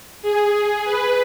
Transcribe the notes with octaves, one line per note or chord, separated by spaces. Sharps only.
G#4
B4